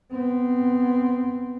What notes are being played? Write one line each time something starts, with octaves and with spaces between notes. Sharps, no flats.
B3 C4